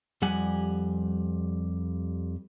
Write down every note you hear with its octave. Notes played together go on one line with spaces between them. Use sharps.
F2 G3 G4 F#5 G#5